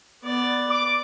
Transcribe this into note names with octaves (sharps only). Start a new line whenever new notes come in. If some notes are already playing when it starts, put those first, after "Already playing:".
B3 D5
D6